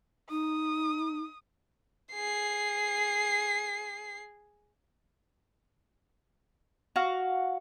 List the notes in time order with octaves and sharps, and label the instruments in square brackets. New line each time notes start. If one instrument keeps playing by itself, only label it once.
[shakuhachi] D#4 [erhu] D#6
[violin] G#4 C7
[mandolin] F#4 F5